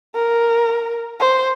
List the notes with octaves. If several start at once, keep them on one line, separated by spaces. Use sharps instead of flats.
A#4
C5